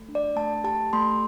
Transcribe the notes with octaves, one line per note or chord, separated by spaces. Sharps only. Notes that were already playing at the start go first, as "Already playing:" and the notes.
Already playing: A3
D4
D5
A3 A5
G4 A5
A3 C6